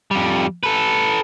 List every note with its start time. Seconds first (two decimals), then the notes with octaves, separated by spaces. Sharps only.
0.11 F2 G3
0.63 A4 B4